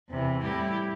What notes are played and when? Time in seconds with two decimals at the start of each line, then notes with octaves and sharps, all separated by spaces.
0.09 E2 C3 E3
0.42 A2 G3 E4 G4